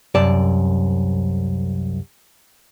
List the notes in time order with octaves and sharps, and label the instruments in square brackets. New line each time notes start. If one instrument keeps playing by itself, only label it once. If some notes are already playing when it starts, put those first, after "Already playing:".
[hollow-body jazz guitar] C2 F#2 D5 A5